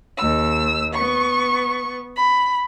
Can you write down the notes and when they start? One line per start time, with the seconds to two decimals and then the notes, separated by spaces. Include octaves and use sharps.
0.19 D#2 E6
0.94 B3 C#6
2.17 B5